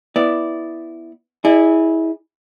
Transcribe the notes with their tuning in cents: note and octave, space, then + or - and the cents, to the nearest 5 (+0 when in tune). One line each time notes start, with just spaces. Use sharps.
B3 +0 E4 +0 D5 +0
E4 -20 G#4 +0 D5 +40